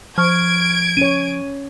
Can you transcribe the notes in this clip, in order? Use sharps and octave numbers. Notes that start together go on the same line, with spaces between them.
F3 C#6 F6 G#6 D7
C#4 C#5 D#7